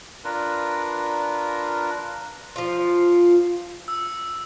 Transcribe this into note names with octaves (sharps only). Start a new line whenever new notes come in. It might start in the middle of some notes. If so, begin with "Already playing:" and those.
D4 F4 A#4 B4
F3 F4
E6